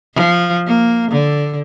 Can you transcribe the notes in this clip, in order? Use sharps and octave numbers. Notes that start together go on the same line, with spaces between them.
F3
A#3
D3